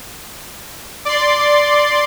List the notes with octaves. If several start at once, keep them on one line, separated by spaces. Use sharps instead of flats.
D5 C6